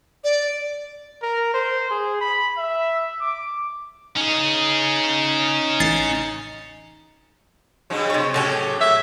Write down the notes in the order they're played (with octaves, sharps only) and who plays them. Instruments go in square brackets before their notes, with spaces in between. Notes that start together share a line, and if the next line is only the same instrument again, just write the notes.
[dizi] D5
[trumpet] A#4
C5
G#4
B5
E5
D6
[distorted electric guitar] C#4 G#4 [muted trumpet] D#4
[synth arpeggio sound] A1 A6 C7
[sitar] G2 C#3 F#3
[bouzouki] C3 C#5
[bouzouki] A2 F#3 G4 [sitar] C#3 C#4
[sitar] A#3 [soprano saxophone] E5